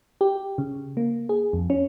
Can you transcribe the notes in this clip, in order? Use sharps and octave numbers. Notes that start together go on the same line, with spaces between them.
G4
C#3
A#3
G#4
F2
C#4